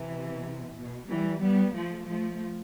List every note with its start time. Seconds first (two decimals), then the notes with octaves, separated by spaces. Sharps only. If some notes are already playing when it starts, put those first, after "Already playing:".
Already playing: C3 E3
0.77 B2
1.10 E3 G3
1.43 G3 B3
1.77 F3 A3
2.10 F3 A3